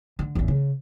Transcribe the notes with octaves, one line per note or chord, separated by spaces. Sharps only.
D3
A1 E2
C#3